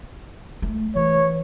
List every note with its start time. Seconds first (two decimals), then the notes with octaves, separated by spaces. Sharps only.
0.62 A3
0.95 E3 C#5